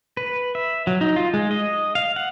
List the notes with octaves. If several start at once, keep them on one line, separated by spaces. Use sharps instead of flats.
B4
E5
F#3
D#4
F4
G#3
D#5
F5
F#5